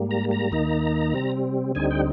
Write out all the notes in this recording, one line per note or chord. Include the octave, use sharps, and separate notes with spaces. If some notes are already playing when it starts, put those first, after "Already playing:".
Already playing: G#2 G3 A#3
A#5
A#5
D#2 D#3 A#3 D#4
C3 G3 C4
D2 D3 G3 C4 D#4 G#5
G5